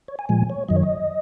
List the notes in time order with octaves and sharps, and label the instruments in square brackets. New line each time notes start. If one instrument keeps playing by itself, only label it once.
[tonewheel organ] C#5
G#5
A#2 F3 G#3 G#5
C#5
F#2 D#3 F#3 D#5
C#5
D#5